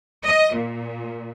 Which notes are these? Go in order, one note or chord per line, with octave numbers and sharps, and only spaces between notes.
D#5
A#2